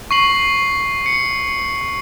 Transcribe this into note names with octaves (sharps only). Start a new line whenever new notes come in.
C#6 C7 F#7
C#7